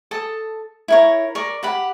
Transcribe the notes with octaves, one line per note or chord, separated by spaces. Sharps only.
A4 A5 D#6
E4 A#4 C#5
A#4 D5 C#6
G4 F#5 B5